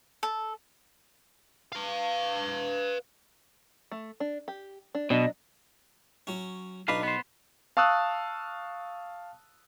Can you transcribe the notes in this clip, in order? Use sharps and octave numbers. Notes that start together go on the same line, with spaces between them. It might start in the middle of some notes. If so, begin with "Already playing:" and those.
A4
B4 F5
A3
D4
G4
D4
B2 F#3 D4 D#5
F#3 C#4
B1 D4 D#4 B4 F5
B3 C5
F5 A5 C#6 D#6 E6 F#6